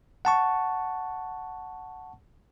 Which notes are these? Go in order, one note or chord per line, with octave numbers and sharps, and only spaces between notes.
F#5 A5 C#6